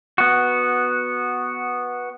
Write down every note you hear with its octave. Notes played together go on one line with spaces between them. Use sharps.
B3 F#4